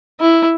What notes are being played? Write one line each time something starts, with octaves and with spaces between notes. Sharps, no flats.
E4